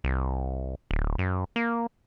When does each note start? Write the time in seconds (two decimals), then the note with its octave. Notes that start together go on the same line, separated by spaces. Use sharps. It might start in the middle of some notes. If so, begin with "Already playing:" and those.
0.04 C2
0.91 D1
1.18 F#2
1.56 A#3